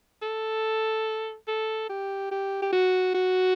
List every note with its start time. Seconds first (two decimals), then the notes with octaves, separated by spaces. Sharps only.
0.22 A4
1.47 A4
1.89 G4
2.31 G4
2.62 G4
2.73 F#4
3.14 F#4